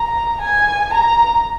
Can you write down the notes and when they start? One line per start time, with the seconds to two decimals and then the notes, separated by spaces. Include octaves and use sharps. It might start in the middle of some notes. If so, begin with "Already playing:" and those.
Already playing: A#5
0.42 G#5
0.93 A#5